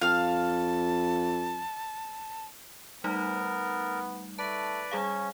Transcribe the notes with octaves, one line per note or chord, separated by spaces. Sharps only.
F2 F5 A5 F6
G3 A3 B3 D#4 A#4
A3 B4 D5 A5
G3 C#4 G#4 F5